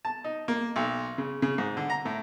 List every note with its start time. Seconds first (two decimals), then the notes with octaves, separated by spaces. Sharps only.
0.05 A5
0.24 D#4
0.48 A#3
0.76 B1
1.18 C#3
1.42 C#3
1.58 G#2
1.77 D3
1.90 A#5
2.05 A2